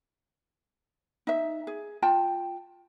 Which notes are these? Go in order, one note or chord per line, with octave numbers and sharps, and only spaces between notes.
D#4 E5
G#4
F4 G5 A5